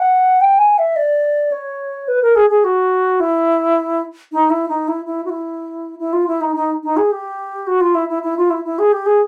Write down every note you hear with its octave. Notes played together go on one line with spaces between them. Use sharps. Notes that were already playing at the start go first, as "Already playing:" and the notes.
Already playing: F#5
G5
G#5
E5
D5
C#5
B4
A#4
G#4
G#4
F#4
E4
D#4
E4
D#4
E4
E4
F#4
E4
E4
F4
E4
D#4
D#4
D#4
G#4
G4
F#4
F4
E4
E4
E4
F4
E4
E4
G#4
G4
G#4